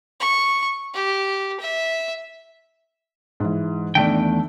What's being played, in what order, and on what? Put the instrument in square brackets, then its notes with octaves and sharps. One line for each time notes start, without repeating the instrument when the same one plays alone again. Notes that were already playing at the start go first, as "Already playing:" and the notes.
[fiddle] C#6
G4
E5
[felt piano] G#2 E3
[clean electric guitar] E2 A3 G5 [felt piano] D#3 D4 D5